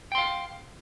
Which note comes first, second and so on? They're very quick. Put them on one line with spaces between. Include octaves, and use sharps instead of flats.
G5 C6 F5